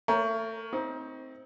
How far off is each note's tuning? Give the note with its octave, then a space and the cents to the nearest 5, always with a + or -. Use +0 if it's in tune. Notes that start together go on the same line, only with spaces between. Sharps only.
A3 +30 A#4 +0 C#5 +0
C4 +0 D#4 +25